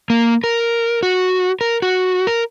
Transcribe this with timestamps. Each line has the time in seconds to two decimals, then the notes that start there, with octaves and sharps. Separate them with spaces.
0.10 A#3
0.44 A#4
1.03 F#4
1.61 A#4
1.82 F#4
2.27 A#4